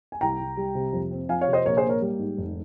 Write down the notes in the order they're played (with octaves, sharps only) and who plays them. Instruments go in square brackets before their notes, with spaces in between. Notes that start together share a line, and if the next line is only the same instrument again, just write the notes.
[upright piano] G#5
C2 G5 A#5
C2
G3
C3
F2
C4
F3 F5 G#5
C#5 F5
C3
C5 D#5
A#1 A#4 C#5
G#4 C5
A#3
A#4 C#5
G3
G#2
F1